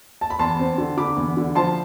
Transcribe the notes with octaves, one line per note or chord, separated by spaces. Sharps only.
A5
B5
E2 A5 C6
C4
D3
D3 B5 D6
E2
D3
F3 A5 C6